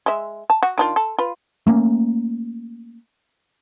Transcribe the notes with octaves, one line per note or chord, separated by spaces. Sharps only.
G#3 E5
A5
F#4
D#3 D4 F4
A4
F4 B4
A3 A#3 C#4